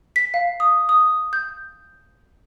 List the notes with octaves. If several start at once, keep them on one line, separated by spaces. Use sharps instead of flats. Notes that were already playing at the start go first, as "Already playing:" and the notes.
B6
F5
D#6
D#6
G6